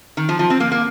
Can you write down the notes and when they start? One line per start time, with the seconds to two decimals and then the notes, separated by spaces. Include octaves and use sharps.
0.17 D#3
0.29 F3
0.39 F3
0.50 C4
0.60 A#3
0.72 A#3